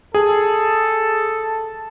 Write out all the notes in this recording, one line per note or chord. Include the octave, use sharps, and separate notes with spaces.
G#4 A4